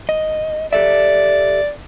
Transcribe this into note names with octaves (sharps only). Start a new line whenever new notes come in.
D#5
G4 A4 D5 E5